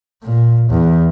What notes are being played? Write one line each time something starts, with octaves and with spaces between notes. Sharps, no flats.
A#2
E2